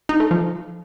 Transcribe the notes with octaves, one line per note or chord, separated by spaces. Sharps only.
D#4
A3
F3